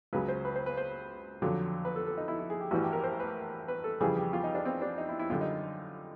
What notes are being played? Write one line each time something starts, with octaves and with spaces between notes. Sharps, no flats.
C#2 C#3 F#3 B4
C5
B4
C5
B4
C5
F2 D3 F#3
B4
A4
A4
D#4
E4
E4
G#4
G4
A1 G2 E3 G3 F#4
G4
A#4
C5
B4
B4
A4
F2 C#3 E3 G3 G#4
G4
F4
D#4
D4
C4
D4
D#4
E4
E4
F#2 D3 G3 F4
D#4